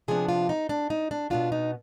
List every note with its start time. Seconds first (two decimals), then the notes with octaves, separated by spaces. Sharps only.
0.08 C3 F3 B3 D4 G#4
0.28 F4
0.49 D#4
0.69 D4
0.90 D#4
1.11 D4
1.30 B2 B3 D4 F4
1.52 D#4